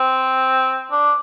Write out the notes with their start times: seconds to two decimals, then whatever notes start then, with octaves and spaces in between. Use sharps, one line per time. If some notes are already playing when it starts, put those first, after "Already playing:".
Already playing: C4
0.91 D4